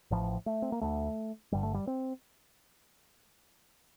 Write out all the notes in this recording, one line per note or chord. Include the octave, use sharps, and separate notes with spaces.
A1 A2 F3
A3
C4
A#3
D2 D3 A3
G1 G2 D3 G3
A3
G3
C4